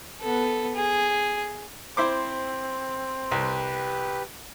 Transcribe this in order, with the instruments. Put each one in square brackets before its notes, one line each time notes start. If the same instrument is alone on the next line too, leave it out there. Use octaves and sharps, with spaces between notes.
[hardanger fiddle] B3 A4
G#4
[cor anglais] C4 [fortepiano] E4 C5 D6
[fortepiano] C2 [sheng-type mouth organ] G4 B4